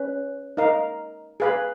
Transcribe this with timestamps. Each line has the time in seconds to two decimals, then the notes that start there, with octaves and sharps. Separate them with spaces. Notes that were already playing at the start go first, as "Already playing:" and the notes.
Already playing: C#4 B4
0.57 D#4 A#4 F5
1.40 G#4 B4 F5 B5